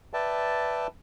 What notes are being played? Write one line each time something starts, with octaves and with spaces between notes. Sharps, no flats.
B4 D5 E5 G5 A5